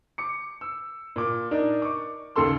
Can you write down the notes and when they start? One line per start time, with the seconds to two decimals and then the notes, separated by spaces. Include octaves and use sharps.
0.18 D6 C#7
0.61 E6
1.16 A#2 D6
1.51 D4 D#4 A#4
1.82 C#6 D6
2.36 D#2 C#3 A4 C6 E6